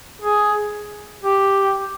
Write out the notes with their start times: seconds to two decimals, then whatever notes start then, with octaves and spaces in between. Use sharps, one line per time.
0.22 G#4
1.23 G4